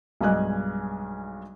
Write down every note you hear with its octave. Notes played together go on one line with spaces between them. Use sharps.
B1 G2 G#3 D#5 G#5 F#6